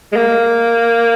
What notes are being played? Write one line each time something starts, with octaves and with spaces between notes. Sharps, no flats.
G#3
A#3